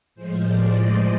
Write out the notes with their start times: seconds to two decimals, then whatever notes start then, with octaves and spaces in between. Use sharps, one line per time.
0.15 A2 F3 G#3 C5
0.44 D5
0.73 D#5